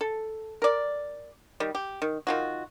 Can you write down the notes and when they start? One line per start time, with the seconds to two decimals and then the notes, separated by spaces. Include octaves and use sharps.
0.01 A4
0.62 A#4 D5
1.60 D#3 G3
1.75 G4
2.02 D#3
2.27 D#3 F4 F#4